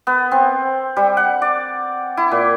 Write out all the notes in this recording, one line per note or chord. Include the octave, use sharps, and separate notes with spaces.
B3
C4
G3
F#5
D5
E4
A#2